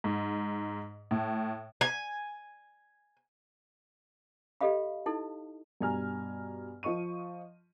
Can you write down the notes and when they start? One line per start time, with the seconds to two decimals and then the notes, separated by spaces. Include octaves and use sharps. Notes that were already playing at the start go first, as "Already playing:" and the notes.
0.04 G#2
1.11 A2
1.81 G#5
4.61 G4 A4 D#5 F5 B5
5.06 D#4 E4 A4
5.81 G2 B2 G3 G#5 A#5 F6
6.83 F3 D#5 C#6 D#7